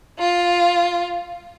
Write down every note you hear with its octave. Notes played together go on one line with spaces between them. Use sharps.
F4